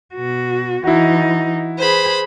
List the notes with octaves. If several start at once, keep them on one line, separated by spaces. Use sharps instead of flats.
B2 F#4
E3 D#4 E4 F#4
G#4 B4 C5 B5